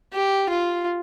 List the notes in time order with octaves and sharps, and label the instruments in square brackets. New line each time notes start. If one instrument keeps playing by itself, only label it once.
[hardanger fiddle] G4
F4